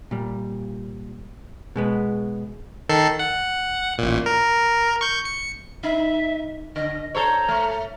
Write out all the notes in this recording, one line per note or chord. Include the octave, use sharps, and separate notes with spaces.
A#2 G3
B2 G#3 B3
D#3 A4 C7
F#5
A1 A#2
A#4
C#6 G6
C#7
D#4 E5
D3 D#5
A4 C5 C#5 A#5
A3